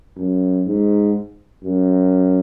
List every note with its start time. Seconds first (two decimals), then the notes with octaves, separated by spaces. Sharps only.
0.16 F#2
0.66 G#2
1.64 F#2